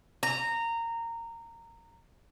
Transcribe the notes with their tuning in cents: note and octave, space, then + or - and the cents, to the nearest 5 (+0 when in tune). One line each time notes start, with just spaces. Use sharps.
A#5 -15